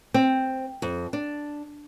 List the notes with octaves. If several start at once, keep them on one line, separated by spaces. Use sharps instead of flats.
C4
F2
D4